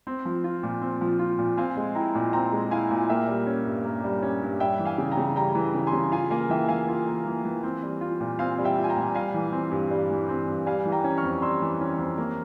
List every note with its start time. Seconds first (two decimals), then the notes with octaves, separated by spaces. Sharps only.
0.07 C4
0.25 F3
0.44 F4
0.63 A#2
0.81 C4
1.01 F3
1.19 F4
1.38 A#2
1.57 C4 F5 G#5
1.77 G#3
1.95 E4 G5 A#5
2.15 A#2
2.33 C4 G5 A#5
2.52 G#3
2.71 E4 F5 G#5
2.91 A#2
3.09 A#3 E5 G5
3.27 G3
3.47 C#4
3.66 G2
3.84 A#3
4.04 G3
4.22 C#4
4.42 G2
4.60 G3 E5 G5
4.79 E3
4.85 F5 G#5
4.98 C#3
5.12 G5 A#5
5.17 C#3
5.36 G3 G5 A#5
5.55 E3
5.74 C#3
5.87 G#5 C6
5.93 C#3
6.12 F4 F5 G#5
6.31 A#3 F5 G#5
6.49 E3 E5 G5
6.69 E3 F5 G#5
6.88 F4
7.07 A#3
7.26 E3
7.45 E3
7.63 C4
7.83 G3
8.01 F4
8.20 A#2
8.39 C4 F5 G#5
8.58 G3
8.64 E5 G5
8.77 F4
8.84 G#5
8.89 G5 A#5
8.97 A#2
9.15 G3 F5 G#5
9.34 E3
9.52 C4
9.71 G2
9.91 G3
10.10 E3
10.29 C4
10.48 G2
10.66 G3 F5 G#5
10.86 E3
10.92 G5 A#5
11.04 C#4
11.17 C#6 F6
11.23 F2
11.42 G3 C6 E6
11.62 E3
11.81 C#4
11.99 F2
12.18 A#3